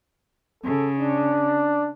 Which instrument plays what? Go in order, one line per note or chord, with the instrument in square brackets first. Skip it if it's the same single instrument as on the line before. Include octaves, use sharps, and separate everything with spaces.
[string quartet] C#3 [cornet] A4
[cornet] D4